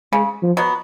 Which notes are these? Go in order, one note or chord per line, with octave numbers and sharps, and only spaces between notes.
C#3 G#3
F3
F#3 B3